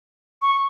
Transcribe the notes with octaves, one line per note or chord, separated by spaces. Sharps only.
C#6